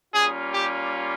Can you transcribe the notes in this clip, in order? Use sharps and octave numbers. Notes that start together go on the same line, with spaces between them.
G3 A#3 C#4 F4 G#4
G4